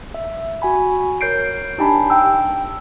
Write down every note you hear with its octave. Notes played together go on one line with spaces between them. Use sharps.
E5
F#4 G#5 B5
A#4 C#5 G6 C7 D7
D4 D#4 G4 G#5 A5 B5
G5 E6